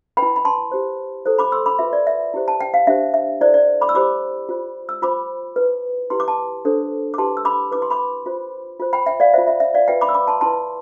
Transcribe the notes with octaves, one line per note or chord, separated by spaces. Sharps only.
B4 G5 B5
E4
B5
A5 C6
E4 G4 C5
E4 A4 C5
B5 D6
C6 E6
B5 D6
F4 B4 E5
D5
E5
E4 G4 C5
A5
G5
F5
D4 G4 C5 E5
E5
E4 A4 C5 D5
D5
B5 D6
E6
E4 G4 C5 B5 D6
F4 C5
E6
F4 C5 B5 D6
E4 B4
E4 G4 B4 C6
D6
A5 C6
D4 A4 C5
D6
E4 G4 B4 A5 C6
E6
B5 D6
E4 B4 D6
C6
B5 D6
F4 C5
F4 C5
G5 B5
E5 G5
D5 F5
F4 C5 E5
E5
E5
D5 F5
F4 B4 E5 G5
B5 D6
E6
B5 D6
A5 C6
E4 B4 A5 C6